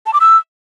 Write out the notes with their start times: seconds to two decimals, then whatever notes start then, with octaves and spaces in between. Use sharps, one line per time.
0.06 A5
0.13 D6
0.21 E6